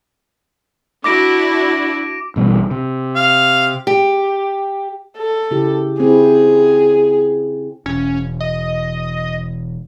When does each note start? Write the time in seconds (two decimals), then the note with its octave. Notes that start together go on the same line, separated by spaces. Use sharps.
1.04 D4 E4 F#4 D6 A#6 D7
2.36 A1 B2 G3
2.71 C3
3.16 F5
3.87 G4
5.17 A4
5.51 C#3 E4 G4
6.00 C4 E4 G#4
7.86 E1 C#4
8.40 D#5